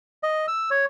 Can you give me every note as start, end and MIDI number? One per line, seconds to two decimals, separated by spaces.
0.23 0.46 75
0.48 0.70 88
0.71 0.85 73